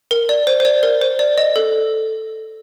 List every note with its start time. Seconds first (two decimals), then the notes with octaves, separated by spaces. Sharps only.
0.11 A#4
0.29 D5
0.47 C5
0.60 C5
0.65 D5
0.83 A#4
1.02 C5
1.19 D5
1.38 D#5
1.56 A4